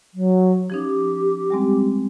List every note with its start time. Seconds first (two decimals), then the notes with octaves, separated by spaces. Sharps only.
0.14 F#3
0.70 F3 C#4 D#4 G4
1.50 G3 G#3 C4